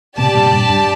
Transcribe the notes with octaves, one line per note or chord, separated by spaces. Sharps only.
A2 C3 G4 D5 A5
G2 A#2
G2
G2